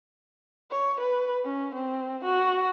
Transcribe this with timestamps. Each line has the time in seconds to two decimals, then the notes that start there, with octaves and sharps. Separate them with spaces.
0.71 C#5
1.00 B4
1.45 C#4
1.75 C4
2.24 F#4